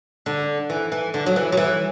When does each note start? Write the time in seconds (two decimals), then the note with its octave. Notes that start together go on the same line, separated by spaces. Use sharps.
0.26 D3
0.70 E3
0.92 E3
1.14 D3
1.26 F#3
1.36 E3
1.52 F#3
1.57 E3